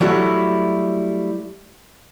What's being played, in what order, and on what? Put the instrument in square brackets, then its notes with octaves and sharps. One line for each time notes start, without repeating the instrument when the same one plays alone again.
[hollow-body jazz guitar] F#3 G3 A3 E4 F#4